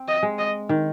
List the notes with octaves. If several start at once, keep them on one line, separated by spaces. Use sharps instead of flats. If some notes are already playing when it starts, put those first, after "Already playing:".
Already playing: C4
D#5
G#3
D#5
D#3